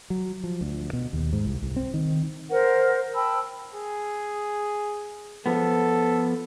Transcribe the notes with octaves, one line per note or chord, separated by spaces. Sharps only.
F#3
F3
D2
B2
D#2
G#2
C2
C2
C4
D#3
A#4 C5 F#5
G5 A5 B5 E6
G#4
F3 B3 A4